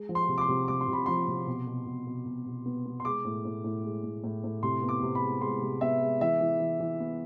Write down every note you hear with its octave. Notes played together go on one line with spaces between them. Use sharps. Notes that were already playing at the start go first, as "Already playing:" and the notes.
Already playing: G#3
F3
C6
C3
D6
C6
C3
C3 D6
C6
C3
B5
F3 C6
C3
B2
B2
B2
B2
B2
B2
B3
B3
C6
G#3 D6
A2
A2
A2
G#3
A2
A2
A2
C3 C6
B3
D6
C3
B5
G#3
G#3 C6
C3
B3 E5
G#3
E3 E5
E3
E3
E3
B3